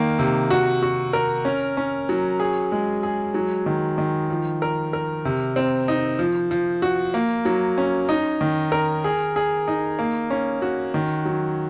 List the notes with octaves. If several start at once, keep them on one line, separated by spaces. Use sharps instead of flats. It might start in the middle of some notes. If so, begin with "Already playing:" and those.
Already playing: D#3 A#3
C3
F#4
F#4
A#4
C#4
C#4
F#3
G#4
G#3
G#4
F#3
D#3
D#3
F3
A#4
A#4
C3
C4
D#4
F3
F3
F#4
A#3
F#3
C#4
D#4
D#3
A#4
G#4
G#4
D#4
A#3
C#4
F#4
D#3
F#3